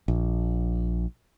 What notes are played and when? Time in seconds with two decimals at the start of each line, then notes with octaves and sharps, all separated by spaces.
0.08 A#1